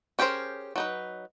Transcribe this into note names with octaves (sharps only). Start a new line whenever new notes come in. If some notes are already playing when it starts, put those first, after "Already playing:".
C#4 G4 G#4 A#4 C5
F#3 D#4 B4